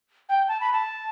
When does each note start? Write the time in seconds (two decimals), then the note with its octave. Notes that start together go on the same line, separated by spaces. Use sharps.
0.29 G5
0.48 A5
0.61 B5
0.73 A5